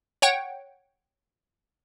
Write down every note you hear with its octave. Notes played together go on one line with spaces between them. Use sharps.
C#5 F#5 G5